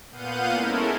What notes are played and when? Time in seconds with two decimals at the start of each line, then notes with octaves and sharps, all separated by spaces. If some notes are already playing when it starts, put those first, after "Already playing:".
0.11 A#2 B3 F5 F#5 G6 D#7
0.52 G#3 C#4 E4 A4 A#4